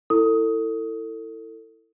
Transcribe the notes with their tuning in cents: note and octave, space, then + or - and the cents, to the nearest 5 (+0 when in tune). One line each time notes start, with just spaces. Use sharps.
E4 +0 A4 +30 D#6 +15